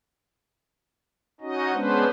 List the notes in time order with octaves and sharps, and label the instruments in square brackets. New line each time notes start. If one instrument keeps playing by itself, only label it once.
[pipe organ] C#4 D#4 F#4 D#5
G#3 B3 C#4 D4 B4 C5